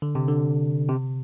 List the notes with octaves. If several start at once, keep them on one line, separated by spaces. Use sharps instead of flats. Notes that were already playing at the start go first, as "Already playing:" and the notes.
D3
C3
D3
C3